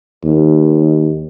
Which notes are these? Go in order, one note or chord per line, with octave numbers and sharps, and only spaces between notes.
D#2